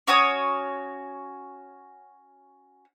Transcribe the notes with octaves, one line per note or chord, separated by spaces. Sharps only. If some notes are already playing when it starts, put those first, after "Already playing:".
C#4 F#4 C#5 D#6